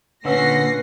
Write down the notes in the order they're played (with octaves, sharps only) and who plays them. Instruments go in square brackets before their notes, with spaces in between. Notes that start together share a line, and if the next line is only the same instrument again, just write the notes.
[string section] A#2 A#6 C7 [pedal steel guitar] D3 F#5 E6 [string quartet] C#4 [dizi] B4